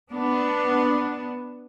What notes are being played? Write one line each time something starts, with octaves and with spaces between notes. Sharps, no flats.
B3 D4